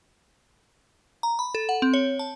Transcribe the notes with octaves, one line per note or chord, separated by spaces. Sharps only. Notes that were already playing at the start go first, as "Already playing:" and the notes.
A#5
B5
A4
F#5
C4
C#5
A5